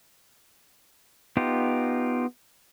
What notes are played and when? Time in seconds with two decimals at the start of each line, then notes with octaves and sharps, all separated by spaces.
1.37 B3 D#4 F4 G4